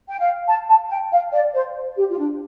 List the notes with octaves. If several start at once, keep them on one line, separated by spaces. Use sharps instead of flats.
G5
F5
A5
A5
G5
F5
D5
C5
G4
F4
D4